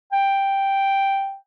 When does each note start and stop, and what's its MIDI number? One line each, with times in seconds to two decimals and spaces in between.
0.12 1.36 79